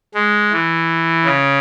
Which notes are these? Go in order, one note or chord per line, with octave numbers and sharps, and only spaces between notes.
G#3
E3
C#3